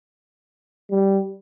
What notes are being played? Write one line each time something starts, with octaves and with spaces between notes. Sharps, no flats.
G3